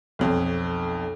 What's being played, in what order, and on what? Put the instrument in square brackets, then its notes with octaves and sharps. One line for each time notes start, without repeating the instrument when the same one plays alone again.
[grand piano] B1 F2